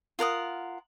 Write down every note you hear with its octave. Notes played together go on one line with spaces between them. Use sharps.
F4 A#4 F#5 D#6